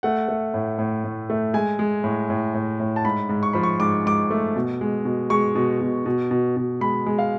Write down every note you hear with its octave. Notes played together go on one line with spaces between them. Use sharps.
A3 F#5
A3
A2
A2
A2
A3
G#3 G#5
G#3
A2
A2
A2
A2
A5
G#2 B5
G#2
C#6
F3 B5
C#6
G#2 D6
G#2 D6
A3
B2
G#3
B2
G#3 C#6
B2
B2
B2
B2
B2
G#3 B5
G#3
F5